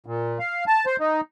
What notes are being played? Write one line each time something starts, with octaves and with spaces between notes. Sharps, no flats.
A#2
F5
A5
C5
D#4